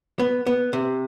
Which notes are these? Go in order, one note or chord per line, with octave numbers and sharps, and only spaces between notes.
B3
B3
C3